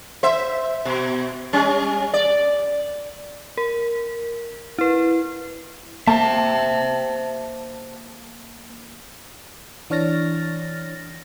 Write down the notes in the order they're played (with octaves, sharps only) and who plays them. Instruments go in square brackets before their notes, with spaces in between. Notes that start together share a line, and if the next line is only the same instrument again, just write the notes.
[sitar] C5 E5
B2
G3 C#4
D5
[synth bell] A#4
E4 B4
[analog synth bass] A#3 [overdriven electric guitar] C5 E5 [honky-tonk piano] A5
[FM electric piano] E3 D4 C#5 F6 A6 A#6